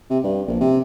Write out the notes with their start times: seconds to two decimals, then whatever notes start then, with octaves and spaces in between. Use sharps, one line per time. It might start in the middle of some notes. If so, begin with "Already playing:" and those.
0.10 C3
0.24 G2
0.48 A#1
0.60 C3